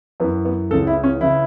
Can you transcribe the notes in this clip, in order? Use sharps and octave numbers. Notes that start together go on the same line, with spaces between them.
F#2 E3 B3
B3
C#2 C#3 E3 A4
E4
C#4
C#3 E3 E4